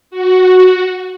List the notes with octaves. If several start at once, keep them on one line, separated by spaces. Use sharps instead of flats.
F#4